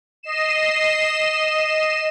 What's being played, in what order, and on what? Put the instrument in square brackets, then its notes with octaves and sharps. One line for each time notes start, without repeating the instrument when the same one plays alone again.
[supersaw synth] D#5 C7 E7